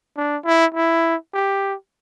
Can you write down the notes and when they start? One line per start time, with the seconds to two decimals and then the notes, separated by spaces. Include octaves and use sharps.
0.17 D4
0.45 E4
0.75 E4
1.34 G4